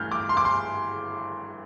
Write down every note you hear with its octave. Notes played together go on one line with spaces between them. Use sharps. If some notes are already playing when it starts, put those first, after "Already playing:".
Already playing: G2 E3 A3 F6 G6
D6
C6
D6
C6